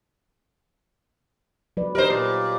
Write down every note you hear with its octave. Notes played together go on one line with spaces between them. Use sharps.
F#3 B4 D5
G4 A#4 C5 D#5
A#2